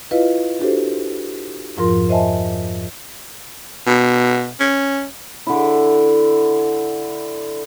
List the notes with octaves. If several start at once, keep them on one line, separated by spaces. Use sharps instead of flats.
E4 F4 B4 D#5 F5
D4 F#4 G4 A4 C5
F2 G#2 F3 F4 A#4 C6
C5 D#5 E5 G#5 A5
B2
C#4
D3 E4